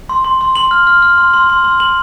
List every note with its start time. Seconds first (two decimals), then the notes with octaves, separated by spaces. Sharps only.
0.09 C6
0.25 C6
0.41 C6
0.56 C6 F#7
0.71 F6
0.87 F6
1.02 F6
1.18 C6
1.34 C6
1.50 C6
1.64 C6
1.80 C6 F#7